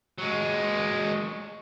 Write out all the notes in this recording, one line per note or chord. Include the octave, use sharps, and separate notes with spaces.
F#3 G#3